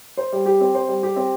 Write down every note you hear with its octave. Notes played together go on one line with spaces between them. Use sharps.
C5
G3
G4
C4
C5
G3
G4
C4